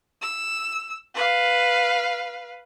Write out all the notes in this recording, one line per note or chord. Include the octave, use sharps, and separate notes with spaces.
E6
B4 F5